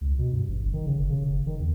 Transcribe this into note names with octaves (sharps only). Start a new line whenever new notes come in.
C#2
B2
G2
A1
G1
D#3
C#3
G1
C#3
F#1
D#3
E2